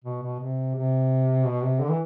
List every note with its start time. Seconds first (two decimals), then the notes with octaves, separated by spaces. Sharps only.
0.04 B2
0.22 B2
0.40 C3
0.75 C3
1.45 B2
1.63 C3
1.80 D3
1.90 E3